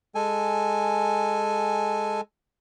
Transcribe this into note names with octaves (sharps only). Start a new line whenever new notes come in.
G#3 A4 G#5